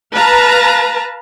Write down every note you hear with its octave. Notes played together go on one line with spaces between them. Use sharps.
B4 F5 A5 A#5